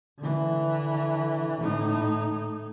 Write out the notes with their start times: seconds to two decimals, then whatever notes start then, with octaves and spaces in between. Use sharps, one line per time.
0.19 D3 E3
1.62 A2 D#4